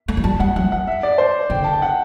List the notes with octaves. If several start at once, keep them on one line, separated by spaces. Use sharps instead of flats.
A3
F#3
G3 A5
G3 F#5
F#3 F#5
F#5
E5
D5
C5
D3 G5
A5
G5
F#5